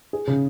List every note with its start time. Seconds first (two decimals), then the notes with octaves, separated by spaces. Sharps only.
0.13 G#4
0.27 C#3